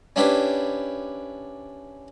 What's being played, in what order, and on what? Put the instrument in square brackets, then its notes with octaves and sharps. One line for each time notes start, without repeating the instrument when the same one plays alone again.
[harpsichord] C#4 D4 E4 G4 B4 C5